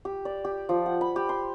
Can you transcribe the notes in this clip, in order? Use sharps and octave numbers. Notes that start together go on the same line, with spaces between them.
G4
D5
G4
F3
F#5
B5
G4
C6